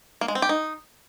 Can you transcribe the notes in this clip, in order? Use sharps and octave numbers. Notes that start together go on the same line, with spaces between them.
A#3
G#3
C4
G4
D#4